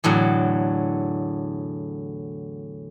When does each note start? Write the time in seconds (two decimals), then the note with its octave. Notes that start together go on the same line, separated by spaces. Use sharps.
0.04 E2 A2 D3 F#3